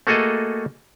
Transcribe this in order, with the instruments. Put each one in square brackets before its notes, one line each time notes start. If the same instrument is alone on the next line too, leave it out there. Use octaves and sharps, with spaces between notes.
[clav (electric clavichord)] A3 A#3 F#4 G#4 A4 D#5